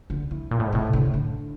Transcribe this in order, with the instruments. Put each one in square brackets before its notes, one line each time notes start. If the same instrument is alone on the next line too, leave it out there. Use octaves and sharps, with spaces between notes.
[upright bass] D3
E3
[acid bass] A#2
A2
G#2
[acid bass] A2 [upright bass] C3
[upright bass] D3
D3